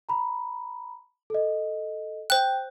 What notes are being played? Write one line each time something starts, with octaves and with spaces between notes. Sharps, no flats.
A#5 B5
A4 D#5
C5 G5 F#6